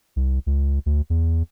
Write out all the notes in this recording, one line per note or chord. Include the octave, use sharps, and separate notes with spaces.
C2
C#2
D2
E2